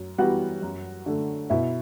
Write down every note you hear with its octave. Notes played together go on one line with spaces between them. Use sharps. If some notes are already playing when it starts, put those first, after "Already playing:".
Already playing: F#2 F#4
E3 G3 B3 F#4 F#5
F#2
D3 A3
B2 E4 E5